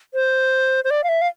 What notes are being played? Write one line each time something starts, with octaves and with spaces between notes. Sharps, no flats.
C5
C5
D5
F5
E5
F5